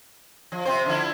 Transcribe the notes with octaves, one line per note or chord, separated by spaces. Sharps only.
F3
C3 C4 C5
D3 F3 E4